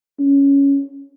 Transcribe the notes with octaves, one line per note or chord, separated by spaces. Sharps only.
C#4